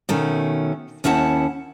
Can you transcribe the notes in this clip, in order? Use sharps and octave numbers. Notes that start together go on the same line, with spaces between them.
B2 D#3 A3 C#4
D#2 C#4 E4 F#5 A5